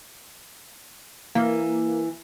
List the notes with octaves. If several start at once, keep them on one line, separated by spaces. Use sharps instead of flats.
E3 A#3